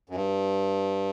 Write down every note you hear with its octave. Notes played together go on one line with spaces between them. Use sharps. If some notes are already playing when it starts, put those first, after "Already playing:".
F#2
G2